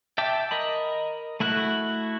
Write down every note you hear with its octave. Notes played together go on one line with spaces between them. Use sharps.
E5 G5 A5 D6
A#4 D#5 B5
A3 E4 F#4 F#6